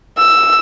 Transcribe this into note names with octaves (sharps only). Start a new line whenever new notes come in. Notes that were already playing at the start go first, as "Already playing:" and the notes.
E6